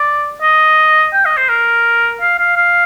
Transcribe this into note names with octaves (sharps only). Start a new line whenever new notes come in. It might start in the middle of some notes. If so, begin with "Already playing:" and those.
Already playing: D5
D#5
G5
D#5
C5
A#4
F5
F5
F5